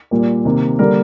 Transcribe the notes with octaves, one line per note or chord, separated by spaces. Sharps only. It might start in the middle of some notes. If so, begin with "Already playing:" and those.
A#2 G3 A#3
C3 D#3 A#3
D3 G3 A#3 A#4